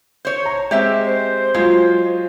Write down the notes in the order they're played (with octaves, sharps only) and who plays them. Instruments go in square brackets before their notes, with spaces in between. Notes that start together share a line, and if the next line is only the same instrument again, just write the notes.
[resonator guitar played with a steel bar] C5 C#5
[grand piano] A#5
[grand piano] G#3 C4 [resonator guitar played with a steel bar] G4 E5
[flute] C5
[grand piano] F#3 F4 [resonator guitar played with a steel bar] G#3